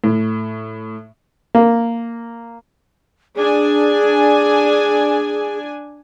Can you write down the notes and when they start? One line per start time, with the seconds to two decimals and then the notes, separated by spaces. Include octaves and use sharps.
0.04 A2
1.55 A#3
3.36 D4 G#4 G#5